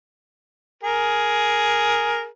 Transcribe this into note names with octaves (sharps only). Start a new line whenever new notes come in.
G#4 A#4